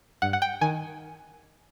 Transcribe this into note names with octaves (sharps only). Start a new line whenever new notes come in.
G2 F#5
F#5
G5
D#3 G#5